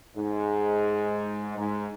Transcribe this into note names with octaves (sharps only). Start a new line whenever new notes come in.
G#2
G#2